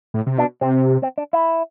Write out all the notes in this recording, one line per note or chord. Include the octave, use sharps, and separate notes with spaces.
A2
C3
B2 D4
C3 C4
C4
D4
E4